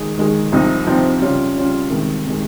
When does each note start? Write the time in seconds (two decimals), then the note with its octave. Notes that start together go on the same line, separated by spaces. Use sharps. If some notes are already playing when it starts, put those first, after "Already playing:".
Already playing: D#3 G#3 D#4 G#4
0.18 D#3 G#3 D#4 G#4
0.52 C2 C3 F3 C4 D#4
0.86 C2 C3 F3 C4 D#4
1.21 C#3 G3 C#4 F4
1.56 C#3 G3 C#4 F4
1.90 C2 C3 D#3 G#3
2.26 C3 D#3 G#3